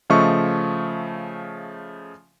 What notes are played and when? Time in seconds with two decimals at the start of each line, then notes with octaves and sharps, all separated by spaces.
0.10 C#3 F3 A3 D#5 E5 C#6